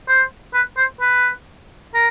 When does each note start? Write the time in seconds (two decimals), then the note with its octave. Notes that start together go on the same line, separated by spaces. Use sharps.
0.08 C5
0.54 B4
0.77 C5
1.01 B4
1.94 A#4